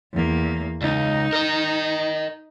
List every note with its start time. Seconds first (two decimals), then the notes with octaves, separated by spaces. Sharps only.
0.14 E2 A#3
0.82 C#2 D#4
1.33 A#4 D#5